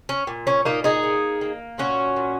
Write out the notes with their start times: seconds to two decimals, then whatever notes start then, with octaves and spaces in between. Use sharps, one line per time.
0.09 C#4
0.27 A#2
0.47 C#4
0.65 A#2 A#3 D#4
0.84 D#4 G#4
1.03 A#3
1.41 A#3
1.78 A#2 C#4 F#4
2.16 A#2